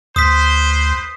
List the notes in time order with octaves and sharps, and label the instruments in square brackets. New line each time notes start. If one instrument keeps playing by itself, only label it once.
[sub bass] D2 [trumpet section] B4 C5 [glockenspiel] D#6 B6